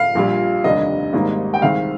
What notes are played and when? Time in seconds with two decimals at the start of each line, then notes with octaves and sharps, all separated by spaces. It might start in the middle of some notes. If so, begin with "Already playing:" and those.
Already playing: F5
0.15 A#1 A#2 G3
0.64 F1 D#2 D3 G3 D4 D#5
1.13 G#1 G#2 G3 A#3 D#4
1.54 G5
1.62 C2 C3 D#3 G#3 C4 F5